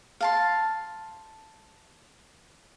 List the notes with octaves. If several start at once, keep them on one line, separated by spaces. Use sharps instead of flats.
F5 A5 C6